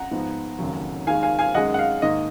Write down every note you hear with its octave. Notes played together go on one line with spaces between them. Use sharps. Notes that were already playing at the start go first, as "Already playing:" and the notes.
Already playing: F#5 A#5
G#2 F3 B3 D#4
F1 D#2 C#3 F#3
D#2 D#3 G#3 F5 G#5
F5 G#5
F5 G#5
F#2 D#3 G#3 D#5 F#5
F#5
F5
G#2 D#3 A#3 D#5